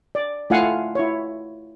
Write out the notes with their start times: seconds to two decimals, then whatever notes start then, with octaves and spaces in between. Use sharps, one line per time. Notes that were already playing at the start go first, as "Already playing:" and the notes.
0.15 D5
0.50 A3 E4 F4 F5 F#5 G#5
0.95 E4 C#5